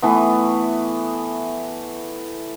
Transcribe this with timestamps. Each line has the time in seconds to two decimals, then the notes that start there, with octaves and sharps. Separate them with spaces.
0.02 E3 A3 B3